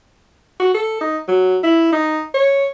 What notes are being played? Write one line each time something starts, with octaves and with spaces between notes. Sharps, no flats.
F#4
A4
D#4
F#3
E4
D#4
C#5